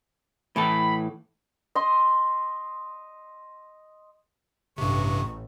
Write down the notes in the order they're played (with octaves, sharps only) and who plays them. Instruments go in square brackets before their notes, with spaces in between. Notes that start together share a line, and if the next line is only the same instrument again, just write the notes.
[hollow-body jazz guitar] A2 E3 A4 [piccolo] B5
[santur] D#5 C6
[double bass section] A1 [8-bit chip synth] G2 C3 [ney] C#6